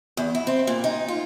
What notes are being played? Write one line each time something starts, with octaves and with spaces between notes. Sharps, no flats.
E2
E4
C4
A#2
D#4
F4